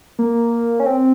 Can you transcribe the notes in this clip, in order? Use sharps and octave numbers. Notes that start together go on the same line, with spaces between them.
A#3
C#4
C4